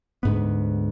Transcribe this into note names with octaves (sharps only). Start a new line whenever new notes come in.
D2 G#2 B3